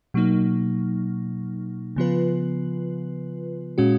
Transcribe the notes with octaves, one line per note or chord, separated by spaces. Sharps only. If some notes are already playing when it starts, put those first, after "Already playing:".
B2 F#3 A#3 D#4
C#3 F3 B3 F4 B4
A#2 G#3 C#4 F#4